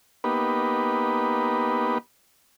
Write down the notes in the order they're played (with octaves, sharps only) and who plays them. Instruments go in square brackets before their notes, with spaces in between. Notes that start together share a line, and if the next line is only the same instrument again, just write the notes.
[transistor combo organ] A#3 B3 D#4 G4 B4